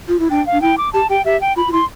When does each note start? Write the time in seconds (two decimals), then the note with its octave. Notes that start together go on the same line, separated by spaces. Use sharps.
0.08 F4
0.19 E4
0.30 D4 G5
0.46 F5
0.52 D4
0.61 E4 G5
0.78 D6
0.93 G4 A5
1.09 G4 G5
1.25 G4 E5
1.41 G5
1.56 F4 B5
1.68 F4
1.72 E4 C6